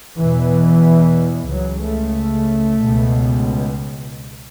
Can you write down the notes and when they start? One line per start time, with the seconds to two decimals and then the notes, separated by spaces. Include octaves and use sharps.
0.19 E2 B2 E3
1.50 C#2 C#3 F#3
1.82 A3
2.80 C#2 B2